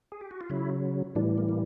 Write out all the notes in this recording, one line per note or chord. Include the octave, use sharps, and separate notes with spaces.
G#4
G4
F#4
F4
C#3 F#3 E4
A2 E3 G3 D4
A#3
A#3